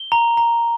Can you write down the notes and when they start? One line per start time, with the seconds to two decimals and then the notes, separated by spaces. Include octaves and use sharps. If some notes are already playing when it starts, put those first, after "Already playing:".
Already playing: G7
0.12 A#5
0.37 A#5